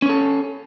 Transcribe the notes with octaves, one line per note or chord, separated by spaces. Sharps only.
C#4 A4 C#5